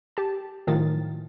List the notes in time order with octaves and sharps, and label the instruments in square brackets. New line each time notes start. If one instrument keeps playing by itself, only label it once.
[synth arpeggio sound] G4 A5
A2 D#3 F3 F#3 A6